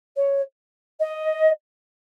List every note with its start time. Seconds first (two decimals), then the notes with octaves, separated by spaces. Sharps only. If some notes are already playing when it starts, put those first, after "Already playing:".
0.16 C#5
0.99 D#5